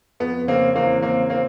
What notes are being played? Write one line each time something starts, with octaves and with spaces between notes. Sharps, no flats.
F2 B3
C#3 A#3 C4
E2 A#3 C4
C#3 A#3 C4
A#3 C4